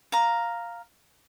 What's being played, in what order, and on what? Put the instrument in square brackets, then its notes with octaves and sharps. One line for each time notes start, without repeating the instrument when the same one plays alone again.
[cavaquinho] F5 A#5